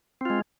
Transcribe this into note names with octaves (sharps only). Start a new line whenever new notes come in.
G#3 C4 F4